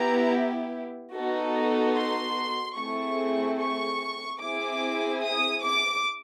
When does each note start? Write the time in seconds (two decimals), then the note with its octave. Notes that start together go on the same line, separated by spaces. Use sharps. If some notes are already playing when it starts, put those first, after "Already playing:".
Already playing: B3 E4 G4 A#5
1.13 B3 D#4 F#4 A4
1.94 C6
2.76 A3 C4 E4 G#4 C#6
3.58 C#6
4.40 C4 E4 G#4 D6
5.21 D#6
5.62 D6